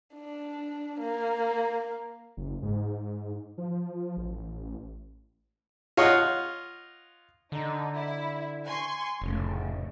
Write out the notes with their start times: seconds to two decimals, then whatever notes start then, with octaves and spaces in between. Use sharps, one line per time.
0.15 D4
1.00 A#3
2.37 F#1
2.62 G#2
3.58 F3
4.17 A1
5.97 F4 C#5 D#5 F#5
7.52 D3 D#4
7.94 E4
8.66 G#5 C6 C#6
9.22 F1 A2 C#3